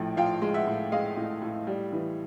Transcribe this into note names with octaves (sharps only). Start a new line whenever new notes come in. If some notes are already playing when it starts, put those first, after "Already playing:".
Already playing: A#1 A2 F3 G5
F3 F5 G5
G#3
E5 F#5
A2
G#3 D#5 F5
A2
A2
G3
E3